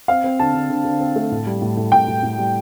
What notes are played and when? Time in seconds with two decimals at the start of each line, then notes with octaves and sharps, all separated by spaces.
0.08 C4 F5
0.24 C4
0.40 D3 A5
0.54 D3
0.70 D3
0.85 D3
1.01 C4
1.16 A3
1.31 A2
1.47 G3
1.62 A2
1.77 A2
1.92 A2 G5
2.08 A2
2.23 A2
2.38 G3